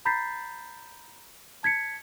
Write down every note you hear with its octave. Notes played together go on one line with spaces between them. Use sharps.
A#5 B5 G6 A6 B6 C7
A5 G#6 B6 C#7